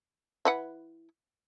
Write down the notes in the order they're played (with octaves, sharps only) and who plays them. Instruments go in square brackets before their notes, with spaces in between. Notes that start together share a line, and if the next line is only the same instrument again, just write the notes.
[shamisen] E3 B4 F#5